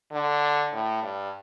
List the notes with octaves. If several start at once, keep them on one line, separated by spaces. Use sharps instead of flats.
D3
A2
G2